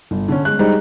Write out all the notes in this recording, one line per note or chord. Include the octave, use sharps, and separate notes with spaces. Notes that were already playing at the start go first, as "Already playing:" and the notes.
G1
D3 C#4
G#3 F#6
G3 G#3 D#4 C5